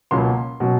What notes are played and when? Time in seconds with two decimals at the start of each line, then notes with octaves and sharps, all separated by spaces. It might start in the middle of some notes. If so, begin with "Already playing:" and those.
0.11 C#2 B2 F#3 A#3 C#4 C6
0.60 B2 F#3 A#3 C#4